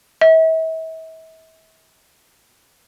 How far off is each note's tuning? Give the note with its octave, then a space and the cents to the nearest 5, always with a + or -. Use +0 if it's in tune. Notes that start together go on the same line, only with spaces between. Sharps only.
E5 -40